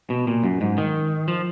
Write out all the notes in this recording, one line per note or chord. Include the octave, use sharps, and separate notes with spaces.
B2
A#2
F#2
G#2
D#3
F3